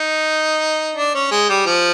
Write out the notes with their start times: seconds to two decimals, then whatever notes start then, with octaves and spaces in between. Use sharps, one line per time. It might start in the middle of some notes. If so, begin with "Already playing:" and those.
Already playing: D#4
0.96 D4
1.14 C#4
1.32 G#3
1.49 G3
1.66 F3